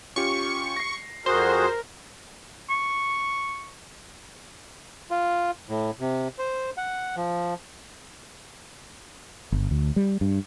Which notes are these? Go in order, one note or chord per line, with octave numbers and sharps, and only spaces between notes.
C#4 F4 G4 C#6
A#6 C7
F2 F#4 G#4 A#4 C5
C#6
F4
A2
C3
C5
F#5
F3
G1
D2
G3
G2